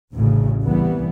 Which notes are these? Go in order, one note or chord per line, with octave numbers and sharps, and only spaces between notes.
A1 D2 A2 C#3
C2 E3 G3 B3